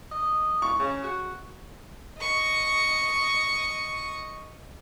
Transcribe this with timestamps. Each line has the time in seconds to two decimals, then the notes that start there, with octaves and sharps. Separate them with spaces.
0.12 D#5
0.62 C#6
0.79 C#3
1.03 F#4
2.19 D#5 C#6